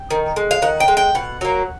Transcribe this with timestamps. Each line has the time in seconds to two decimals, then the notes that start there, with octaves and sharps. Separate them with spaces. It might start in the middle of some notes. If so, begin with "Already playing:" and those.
Already playing: G5
0.11 D#3
0.36 G#3
0.51 F5
0.62 D#3 F#5
0.80 G5
0.88 G#3
0.97 G5
1.15 B2 F#5
1.41 F#3 A#3